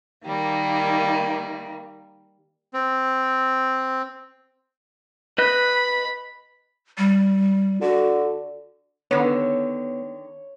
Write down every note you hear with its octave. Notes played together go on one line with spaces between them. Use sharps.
D#3 G3 A#3
C4
B4 D#5 B5 F#6
G3
D3 F#4
D3 D#3 B3 C#5